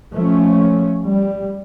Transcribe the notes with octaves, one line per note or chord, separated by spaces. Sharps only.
F3 A3 C#4
G3